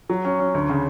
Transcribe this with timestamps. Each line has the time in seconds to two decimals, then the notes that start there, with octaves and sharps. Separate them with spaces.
0.10 F#3
0.25 C#4
0.40 C#4
0.54 D2
0.69 C#3